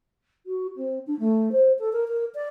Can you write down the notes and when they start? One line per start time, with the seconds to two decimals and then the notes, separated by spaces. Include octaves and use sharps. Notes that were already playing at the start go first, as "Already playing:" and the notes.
0.46 F#4
0.76 C4
1.06 D4
1.19 A3
1.52 C5
1.78 A4
1.92 A#4
2.07 A#4
2.34 D5